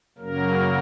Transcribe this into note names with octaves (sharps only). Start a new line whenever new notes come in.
F#2 C#3 F#3 A#3 A#4